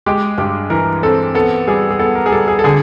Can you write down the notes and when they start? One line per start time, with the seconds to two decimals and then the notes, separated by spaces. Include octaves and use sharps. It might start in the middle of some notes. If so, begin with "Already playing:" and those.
0.06 G#3 G4
0.38 G2 G4
0.70 E3 A#4
1.03 C4 A4
1.35 B3 A4
1.68 G3 G#4
1.91 G#4
1.99 B3 A4
2.15 A#4
2.26 G#4
2.32 G3 A4
2.48 G#4
2.59 A4
2.64 D3 G#4